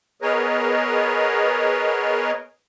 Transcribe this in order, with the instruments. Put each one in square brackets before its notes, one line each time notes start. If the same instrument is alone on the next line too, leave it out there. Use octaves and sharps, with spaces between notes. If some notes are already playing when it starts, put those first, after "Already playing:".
[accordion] B3 G#4 A#4 B4 C#5 D#5